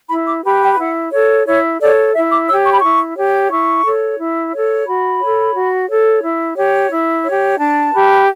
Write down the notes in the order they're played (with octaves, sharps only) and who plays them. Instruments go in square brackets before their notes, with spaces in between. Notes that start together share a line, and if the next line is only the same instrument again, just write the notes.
[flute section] E4 B5
D6
G4 B4 B5
G5
E4 F#5
A4 C#5
E4 C#5
A4 C#5 D5
E4 E5
D6
C#5 E6
G4
C#6
B5
E4 C#6
G4 C#5
E4 C#6
A4 C#5
E4
A4 C#5
F#4 B5
A4 C#5
F#4
A4 C#5
E4
G4 C#5
E4
G4 C#5
D4 A5
G4 B4